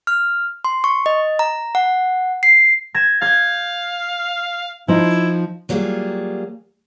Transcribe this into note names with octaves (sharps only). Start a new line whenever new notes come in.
F6
C6
C#6
D#5
A#5
F#5
C7
G#6 A#6 E7
F5 G6 G#6
F3 D#4 E4
F#3 G3 A#3 F4 G#4